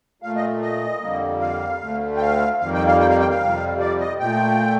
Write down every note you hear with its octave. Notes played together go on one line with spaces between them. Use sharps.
A#2 A3 F5
D#5
D#5
F2 D3 G3 A#3
F5
D2 D3 A3
G5
F5
F2 D#3 G3 A#3 F5
G5
F5
G5
F5
G5
F5
F2 C3 G3
D5
D#5
A#2 A3 G5